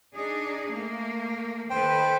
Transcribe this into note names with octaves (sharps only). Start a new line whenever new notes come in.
D4 D#4 G#4
A3 A#3
D#3 A4 B4 C5 G5